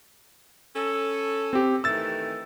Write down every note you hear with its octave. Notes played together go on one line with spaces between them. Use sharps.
C#4 A4
C4 G4
D#3 E3 A3 E6 A6